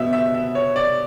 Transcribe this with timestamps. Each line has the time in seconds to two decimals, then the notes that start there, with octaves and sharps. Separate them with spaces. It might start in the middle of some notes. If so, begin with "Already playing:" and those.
Already playing: B2 B3 E5
0.13 E5
0.34 E5
0.55 C#5
0.76 D5